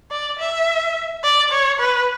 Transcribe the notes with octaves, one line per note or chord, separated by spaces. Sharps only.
D5
E5
D5
C#5
B4